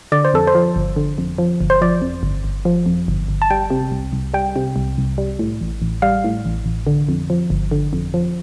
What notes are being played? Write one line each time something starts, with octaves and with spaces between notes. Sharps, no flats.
D3 D5
C5
F2 A4
C5
F3
G1
D3
F2
F3
G1
C5
F3 D5
F2
G1
G1
F3
F2
G1
G1
A5
G3 G5
C3
C2
C2
G3 G5
C3
C2
C2
G3
A2
A1
A1
G3 F5
A2
A1
A1
D3
F2
F3
G1
D3
F2
F3